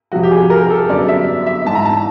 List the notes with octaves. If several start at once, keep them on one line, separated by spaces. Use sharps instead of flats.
F2 C3 F3 F#4
G4
G#4
A#4
A4
F#2 D3 G3 B3 D5
E5
E5
G#2 E3 G#3 A5
A#5
A5